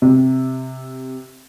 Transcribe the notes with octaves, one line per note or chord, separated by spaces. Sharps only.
C3